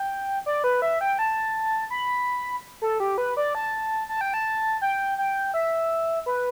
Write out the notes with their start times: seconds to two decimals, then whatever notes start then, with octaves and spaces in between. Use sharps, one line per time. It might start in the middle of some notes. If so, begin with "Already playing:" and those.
Already playing: G5
0.46 D5
0.64 B4
0.82 E5
1.01 G5
1.19 A5
1.90 B5
2.82 A4
3.00 G4
3.18 B4
3.37 D5
3.55 A5
4.09 A5
4.21 G5
4.34 A5
4.82 G5
5.18 G5
5.54 E5
6.26 B4